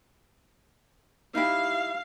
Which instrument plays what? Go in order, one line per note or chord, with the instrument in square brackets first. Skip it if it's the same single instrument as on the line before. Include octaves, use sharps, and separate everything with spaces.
[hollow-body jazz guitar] D#4 E4 G4 [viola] F5